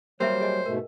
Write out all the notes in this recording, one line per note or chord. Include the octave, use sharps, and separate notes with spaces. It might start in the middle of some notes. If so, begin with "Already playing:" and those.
F#3 G3 A#3 G4 C5 E5 G5
G#4 D#5 G#5
G#2 B2 A3 A#4